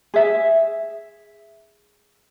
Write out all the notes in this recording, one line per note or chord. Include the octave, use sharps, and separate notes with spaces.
G#4 E5